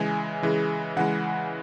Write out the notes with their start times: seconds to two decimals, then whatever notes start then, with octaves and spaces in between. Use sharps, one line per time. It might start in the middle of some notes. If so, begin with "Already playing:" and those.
Already playing: C#3 E3 G#3 G#5
0.43 C#3 E3 G#3
0.96 C#3 E3 G#3 F#5